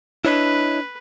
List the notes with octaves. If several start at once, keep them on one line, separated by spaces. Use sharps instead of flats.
D4 E4 B4 C#5 D#5